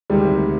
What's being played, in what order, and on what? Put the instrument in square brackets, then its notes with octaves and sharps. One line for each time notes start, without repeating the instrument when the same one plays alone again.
[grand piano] D2 C3 D#3 G#3 [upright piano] G3